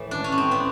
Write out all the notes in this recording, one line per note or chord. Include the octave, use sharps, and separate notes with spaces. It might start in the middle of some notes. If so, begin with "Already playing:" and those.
Already playing: A2 E3
D4
C#4
B3
C4
B3